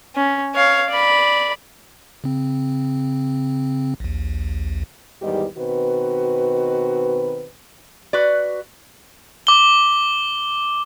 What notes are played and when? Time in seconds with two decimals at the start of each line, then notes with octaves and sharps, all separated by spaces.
0.15 C#4
0.55 C#5 F5
0.90 D5 B5
2.24 C#3 C4
4.00 A#1 D#2
5.21 E2 G#2 D#3 G3 G4 D#5
5.57 B2 D#3 C4 F#4 B4
8.13 F#4 B4 D5
9.47 D6 G7